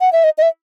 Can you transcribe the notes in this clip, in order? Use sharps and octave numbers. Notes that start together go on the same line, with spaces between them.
F#5
E5
D#5
D#5
E5